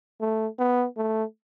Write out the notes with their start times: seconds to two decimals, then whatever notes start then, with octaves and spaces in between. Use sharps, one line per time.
0.21 A3
0.59 B3
0.97 A3